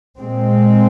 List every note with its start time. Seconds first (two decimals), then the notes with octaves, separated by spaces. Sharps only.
0.17 A#2 G#3 C4